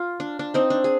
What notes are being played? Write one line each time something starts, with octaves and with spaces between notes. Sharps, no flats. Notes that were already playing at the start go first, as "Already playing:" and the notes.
Already playing: F4
D4
D4
C4 D#4
D4
G#4